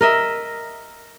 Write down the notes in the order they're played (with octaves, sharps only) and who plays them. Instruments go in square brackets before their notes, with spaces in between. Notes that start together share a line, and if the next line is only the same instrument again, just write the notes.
[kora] A#4 D#5 E5